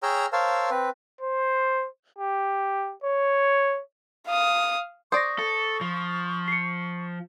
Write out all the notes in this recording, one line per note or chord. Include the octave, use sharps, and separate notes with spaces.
G#4 C#5 G5 A#5 E6 F6
A#4 C5 C#5 F5 A5 E6
C4 B4
C5
G4
C#5
F5 D#6
C5 D5 C#6 D#6 A#6
A4
F3
C7 C#7